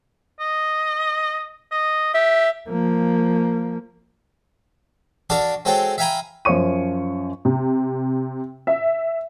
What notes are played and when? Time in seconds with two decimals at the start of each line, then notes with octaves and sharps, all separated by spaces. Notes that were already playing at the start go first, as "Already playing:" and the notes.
0.40 D#5
1.72 D#5
2.15 G4 E5
2.69 F3 A#3
5.30 D4 F#4 A4 F5 A5 D6
5.65 G#3 C4 F#4 A4 C#5 G5
5.98 E5 F5 G5 G#5 A#5 B5
6.45 F#2 F3 C5 C#5 C#6 D#7
7.45 C3
8.67 E5